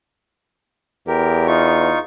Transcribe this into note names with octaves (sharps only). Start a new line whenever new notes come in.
E2 G4 A#4
D#4 F4 C#6